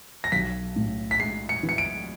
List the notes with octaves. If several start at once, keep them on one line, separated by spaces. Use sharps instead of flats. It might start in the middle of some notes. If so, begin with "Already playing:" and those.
A#6
B1 B6
A2
B6
G#3 C7
C#7
E3
C#7
D7